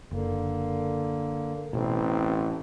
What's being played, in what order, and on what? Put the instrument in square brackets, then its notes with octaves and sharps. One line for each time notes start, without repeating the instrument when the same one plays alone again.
[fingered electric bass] F#1 [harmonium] D3 A#3
[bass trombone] A1 [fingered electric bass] B2 [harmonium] C4